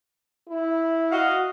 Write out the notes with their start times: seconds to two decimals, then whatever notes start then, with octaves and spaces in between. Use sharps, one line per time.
0.49 E4
1.11 F#4 D#5 F5